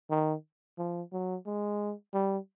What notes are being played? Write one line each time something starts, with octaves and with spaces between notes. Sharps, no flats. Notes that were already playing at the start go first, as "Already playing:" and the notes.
D#3
F3
F#3
G#3
G3